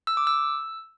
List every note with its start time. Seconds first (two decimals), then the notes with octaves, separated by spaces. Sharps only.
0.07 E6
0.17 D6
0.27 E6